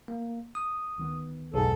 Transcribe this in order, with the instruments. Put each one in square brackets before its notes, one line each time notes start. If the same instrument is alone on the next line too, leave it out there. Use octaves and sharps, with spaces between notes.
[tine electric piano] A#3
D#6
[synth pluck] D2 D#3 B3
[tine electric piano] B1 G#2 [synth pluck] F2 B2 G#4 [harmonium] A4